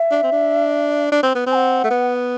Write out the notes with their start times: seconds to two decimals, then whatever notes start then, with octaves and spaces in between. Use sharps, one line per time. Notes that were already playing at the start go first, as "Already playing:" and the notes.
Already playing: E5
0.11 D4
0.23 C4
0.32 D4
1.12 D4
1.23 C4
1.35 B3
1.47 C4 G#5
1.55 F#5
1.84 A3
1.91 B3